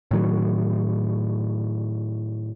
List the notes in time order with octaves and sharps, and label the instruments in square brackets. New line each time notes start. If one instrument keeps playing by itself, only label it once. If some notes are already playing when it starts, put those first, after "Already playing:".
[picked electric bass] A2 D#3 F#3